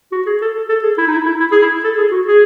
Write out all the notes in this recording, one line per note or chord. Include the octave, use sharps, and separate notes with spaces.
F#4
G#4
A4
A4
G#4
E4
D#4
E4
E4
E4
G#4
E4
A4
G#4
F#4
G#4